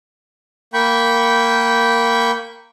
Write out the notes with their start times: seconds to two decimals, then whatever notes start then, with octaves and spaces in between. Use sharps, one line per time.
0.74 A#3 G5 B5 C#6 G6